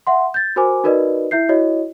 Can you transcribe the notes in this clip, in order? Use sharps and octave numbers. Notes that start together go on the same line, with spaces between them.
E5 F#5 C6
G6 A6
F#4 A#4 C5 G#5 D6
D#4 F#4 A#4 B4 D5 D#5
E4 E5 G6 C7
E4 F#4 C#5 D#5